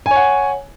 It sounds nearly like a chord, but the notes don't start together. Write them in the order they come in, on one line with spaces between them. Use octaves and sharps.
G#5 C#5 F#5